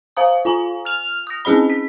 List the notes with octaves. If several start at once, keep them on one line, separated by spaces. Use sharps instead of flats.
C5 F5 A#5 D#6
F4 G#5 A#5
F6 F7
D#6 A#6
C4 C#4 G#4 D#5 B5
B6